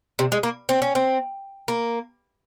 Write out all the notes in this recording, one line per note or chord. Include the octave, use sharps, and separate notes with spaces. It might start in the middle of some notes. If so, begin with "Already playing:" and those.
C3
G#3
A#3
C4
C#4
C4
A#3